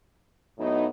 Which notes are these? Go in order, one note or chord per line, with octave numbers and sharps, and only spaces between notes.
A2 F#3 B3 D#4